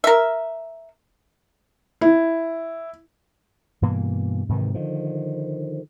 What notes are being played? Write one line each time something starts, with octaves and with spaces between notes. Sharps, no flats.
A#4 E5
E4
G2 B2 E3 A#3
G#2 C3 D#3 E3
D3 D#3 F3